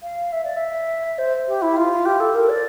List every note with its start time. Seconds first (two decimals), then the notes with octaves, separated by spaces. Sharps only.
0.02 F5
0.32 E5
0.44 D5
0.56 E5
1.18 C5
1.47 G4
1.62 E4
1.76 F4
2.05 G4
2.20 A4
2.34 A#4
2.49 D5